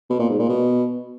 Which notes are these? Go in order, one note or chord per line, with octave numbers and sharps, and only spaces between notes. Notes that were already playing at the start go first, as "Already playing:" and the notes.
B2
A#2
G#2
A#2
B2